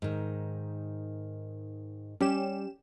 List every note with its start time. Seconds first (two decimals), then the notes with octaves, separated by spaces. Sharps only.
0.02 G#2 D#3
2.21 G3 C#4 G4 E7